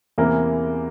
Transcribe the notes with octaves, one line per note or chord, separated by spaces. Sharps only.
E2 C3 E3 A#3 A#4